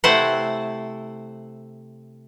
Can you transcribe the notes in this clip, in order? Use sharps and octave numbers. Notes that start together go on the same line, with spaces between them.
C3 A3 E4 C5 F#5